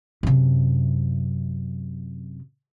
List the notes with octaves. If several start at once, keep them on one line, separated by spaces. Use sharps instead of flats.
F#2 C3